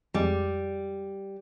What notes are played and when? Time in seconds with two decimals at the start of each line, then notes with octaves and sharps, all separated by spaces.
0.14 F2 G3 G#3